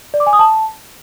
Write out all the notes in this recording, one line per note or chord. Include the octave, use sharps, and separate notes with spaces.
D5
D6
G#5
D#6
A5